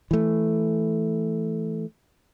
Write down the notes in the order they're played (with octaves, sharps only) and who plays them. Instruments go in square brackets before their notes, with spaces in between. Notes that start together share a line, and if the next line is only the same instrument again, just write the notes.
[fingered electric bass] E3 A3